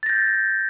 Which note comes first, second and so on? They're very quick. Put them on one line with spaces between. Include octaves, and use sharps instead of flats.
A6 A#6 G6